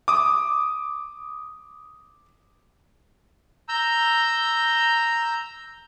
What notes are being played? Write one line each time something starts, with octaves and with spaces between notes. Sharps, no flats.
D6 D#6
A#5 E6 G6